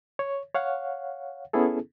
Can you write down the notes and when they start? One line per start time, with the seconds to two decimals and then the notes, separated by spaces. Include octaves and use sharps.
0.19 C#5
0.55 C#5 F5 F#5
1.53 B3 C#4 E4 G#4 A4